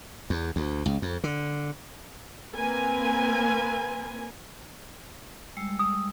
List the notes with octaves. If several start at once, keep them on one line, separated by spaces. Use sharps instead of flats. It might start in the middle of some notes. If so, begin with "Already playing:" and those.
E2
D2
C#2
F2
D3
A#3 C4 A#4 B4 G#5
G3 G#3 E6
D#6